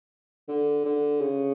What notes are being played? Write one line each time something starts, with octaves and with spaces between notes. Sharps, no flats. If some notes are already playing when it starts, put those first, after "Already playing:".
D3
D3
C#3